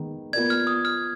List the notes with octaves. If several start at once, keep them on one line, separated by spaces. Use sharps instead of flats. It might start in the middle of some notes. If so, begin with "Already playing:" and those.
Already playing: D#3 G#3 B3 D#4
B3 F4 A#4 D5 G#6
F6
D#6
F6